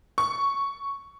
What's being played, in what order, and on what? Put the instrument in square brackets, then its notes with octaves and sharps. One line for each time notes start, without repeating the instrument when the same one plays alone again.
[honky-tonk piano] C#6